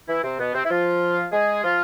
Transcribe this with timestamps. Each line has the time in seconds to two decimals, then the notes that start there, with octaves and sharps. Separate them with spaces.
0.08 E3 E4
0.24 C3 C4
0.39 B2 B3
0.55 C3 C4
0.65 E4
0.70 F3 F4
1.32 G#3 G#4
1.64 F3 F4